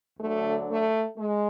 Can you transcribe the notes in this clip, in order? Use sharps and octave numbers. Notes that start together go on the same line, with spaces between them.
D2 D3 F#3 A3
A3
G#3